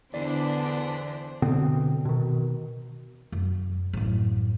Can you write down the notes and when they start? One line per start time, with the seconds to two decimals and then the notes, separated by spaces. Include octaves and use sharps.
0.14 E2 D3 B3 D4 C5 D5
1.42 B2 D3 B3 C4
2.05 B2 D#3
3.32 F#2
3.93 A1 F#2